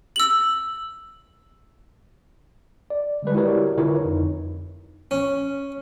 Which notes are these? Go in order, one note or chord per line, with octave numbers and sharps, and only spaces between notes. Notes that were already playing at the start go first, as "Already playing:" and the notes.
E6 F#7
D5
D3 G3 G#3 B4
E4 F#4 G4 A#4 C#5 D5
D3 E4 F4 A#4 B4 C#5
F2 D#4
C#4